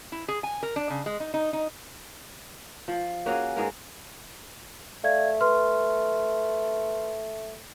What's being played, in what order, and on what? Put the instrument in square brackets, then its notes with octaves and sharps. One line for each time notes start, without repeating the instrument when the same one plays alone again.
[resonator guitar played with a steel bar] E4
G#4
G#5
A#4
D4
C#3
G#3
D#4
D#4
D#4
[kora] F3
A#3 C#4 F#4 G#4
G#2 B3 G#4 A#4
[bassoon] A3 [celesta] D5 F5 G#6
[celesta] B4 C6 F6